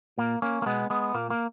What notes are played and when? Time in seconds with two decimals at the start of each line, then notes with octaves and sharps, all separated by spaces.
0.18 A#2 A#3
0.42 A#3 C#4
0.62 A#3
0.66 B2 G#3 B3
0.90 G#3 B3
1.14 A#2 A#3
1.30 A#3